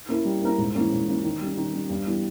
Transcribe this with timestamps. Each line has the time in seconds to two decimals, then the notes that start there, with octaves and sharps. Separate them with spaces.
0.09 A#3 C#4 E4 A#4
0.25 G3
0.42 A#3 C#4 E4 A#4
0.58 G#2
0.75 E3 A#3 C#4
0.91 G#2
1.08 E3 A#3 C#4
1.24 D#3
1.41 G3 C#4
1.57 D#3
1.73 G3 C#4
1.90 G2
2.06 E3 G3 B3